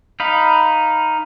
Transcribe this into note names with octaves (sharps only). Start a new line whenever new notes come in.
D#4 F5 B5